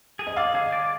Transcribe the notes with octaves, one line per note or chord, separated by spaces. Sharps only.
G#4
D#5
D5 F5
G#4 D#5
D5